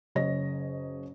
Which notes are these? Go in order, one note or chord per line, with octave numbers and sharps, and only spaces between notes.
F#1 C#3 C#5 D#5 A#6